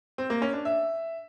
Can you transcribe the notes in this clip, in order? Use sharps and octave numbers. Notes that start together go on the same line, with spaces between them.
C4
A#3
C#4
D4
E5